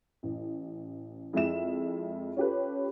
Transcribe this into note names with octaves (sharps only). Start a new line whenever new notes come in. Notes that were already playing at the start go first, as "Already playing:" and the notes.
A1
F2 G#3 E4 E5 E7
C#4 F4 G4 A4 B4